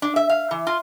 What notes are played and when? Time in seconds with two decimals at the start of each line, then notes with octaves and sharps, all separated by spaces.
0.02 D4
0.16 E5
0.29 F5
0.51 E3
0.67 F4